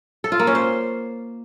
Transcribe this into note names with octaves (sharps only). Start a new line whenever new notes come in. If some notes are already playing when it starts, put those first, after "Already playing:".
A4
F4
A#3
C#4
C5